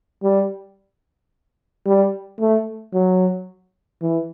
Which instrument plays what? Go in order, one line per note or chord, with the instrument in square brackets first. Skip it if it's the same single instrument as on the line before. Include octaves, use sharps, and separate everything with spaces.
[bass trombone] G3
G3
A3
F#3
E3